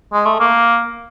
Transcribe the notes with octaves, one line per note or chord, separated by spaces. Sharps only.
G#3
A3
A#3